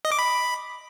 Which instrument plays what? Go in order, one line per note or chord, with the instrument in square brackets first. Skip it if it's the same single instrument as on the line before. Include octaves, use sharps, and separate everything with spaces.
[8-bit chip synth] D#5
D6
B5